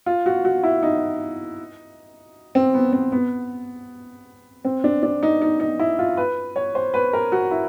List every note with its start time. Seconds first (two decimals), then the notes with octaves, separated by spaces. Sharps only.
0.06 F4
0.26 F#4
0.45 F#4
0.63 E4
0.83 D#4
2.55 C4
2.74 B3
2.93 C4
3.12 B3
4.65 C4
4.84 D4
5.03 D4
5.23 D#4
5.42 D#4
5.60 D#4
5.79 E4
5.99 F4
6.17 B4
6.56 C#5
6.75 C5
6.94 B4
7.13 A#4
7.32 F#4
7.51 E4